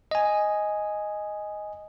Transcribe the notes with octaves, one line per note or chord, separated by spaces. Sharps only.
D#5 G#5